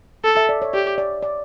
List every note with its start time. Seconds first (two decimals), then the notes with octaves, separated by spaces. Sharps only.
0.24 A4
0.37 E5
0.49 D5
0.62 C#5
0.73 G4 D5
0.98 D5
1.22 D5